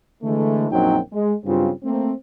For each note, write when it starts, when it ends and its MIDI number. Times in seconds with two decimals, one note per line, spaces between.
0.23 0.67 50
0.23 0.67 52
0.23 0.67 56
0.23 0.67 57
0.71 0.99 34
0.71 0.99 42
0.71 0.99 54
0.71 0.99 60
0.71 0.99 63
0.71 0.99 79
1.12 1.34 56
1.45 1.70 43
1.45 1.70 49
1.45 1.70 54
1.45 1.70 60
1.45 1.70 65
1.84 2.12 57
1.84 2.12 58
1.84 2.12 60